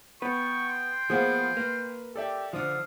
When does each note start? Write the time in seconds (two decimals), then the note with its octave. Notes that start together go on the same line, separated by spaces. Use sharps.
0.22 B3 B4 G5 C#6
0.69 C6
1.10 F3 A#3 B3 G#4 F5
1.57 A#3 B4
2.16 G4 A4 D5 E5
2.53 D3 F3 F5 D#6